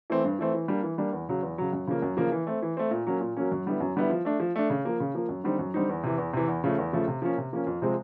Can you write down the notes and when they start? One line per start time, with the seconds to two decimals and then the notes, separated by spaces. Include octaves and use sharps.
0.10 E3 A3 C4
0.25 G2
0.39 E3 A3 C4
0.54 E3
0.68 G3 A#3 D4
0.83 E3
0.98 G3 A#3 D4
1.13 E2
1.29 C#3 F#3
1.43 E2
1.58 C#3 F#3
1.73 F#2
1.87 C#3 F3 A#3
2.02 F#2
2.17 C#3 F3 A#3
2.32 E3
2.47 A3 C4
2.62 E3
2.77 A3 C4
2.91 A#2
3.06 F#3 A#3 C#4
3.21 A#2
3.37 F#3 A#3 C#4
3.52 F#2
3.66 D3 G3 B3 E4
3.80 F#2
3.96 D3 G3 B3 E4
4.10 F3
4.25 A3 D4
4.40 F3
4.56 A3 D4
4.70 C#3
4.85 F3 A#3
5.00 C#3
5.15 F3 A#3
5.29 F#2
5.44 D3 G3 C4 D#4
5.59 F#2
5.74 D3 G3 C4 D#4
5.89 E2
6.03 C3 E3
6.18 E2
6.33 C3 E3
6.48 E2
6.64 C#3 F3 A3
6.79 E2
6.93 C#3 F3 A3
7.08 C3
7.22 F3 A#3 C#4
7.38 C3
7.53 F3 A#3 C#4
7.67 F2
7.82 C3 F3 G#3 C4